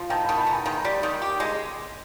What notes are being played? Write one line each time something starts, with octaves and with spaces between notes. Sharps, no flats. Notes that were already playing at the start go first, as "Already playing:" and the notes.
Already playing: F3
D#3 G5 A5
D#3 A5 B5
A5 B5
B3 G#5 A#5
D#3 A#5 C6
G3
D#3
G4
G#3